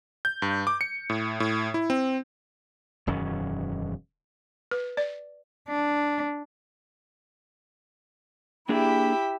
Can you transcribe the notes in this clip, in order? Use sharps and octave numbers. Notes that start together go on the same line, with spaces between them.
G6
G2
D6
C#7
A2
A2
E4
C4
E1 F#2 D#3 C#4
B4
D5
D4
A#3 D4 E4 G4 G#4 E5